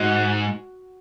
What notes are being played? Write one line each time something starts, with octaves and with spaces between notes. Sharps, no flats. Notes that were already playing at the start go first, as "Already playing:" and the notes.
Already playing: G#2 F#4